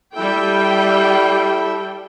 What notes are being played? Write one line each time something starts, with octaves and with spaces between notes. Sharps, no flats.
G3 E4 A4 E5 G5